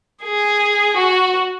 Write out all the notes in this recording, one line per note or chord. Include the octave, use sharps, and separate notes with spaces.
G#4
F#4